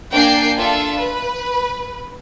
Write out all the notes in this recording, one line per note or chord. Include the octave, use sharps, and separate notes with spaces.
A#3 D4 G5 G#5 C7
D4 F4 A4 E5
B4